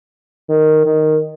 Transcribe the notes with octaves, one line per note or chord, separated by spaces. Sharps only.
D#3
D#3